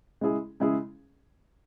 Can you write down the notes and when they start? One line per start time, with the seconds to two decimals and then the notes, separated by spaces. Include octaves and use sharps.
0.21 C#3 G#3 E4 G#4
0.60 C#3 G#3 E4 G#4